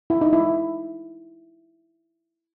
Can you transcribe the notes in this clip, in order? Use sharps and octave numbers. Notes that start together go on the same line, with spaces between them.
E4
D#4
E4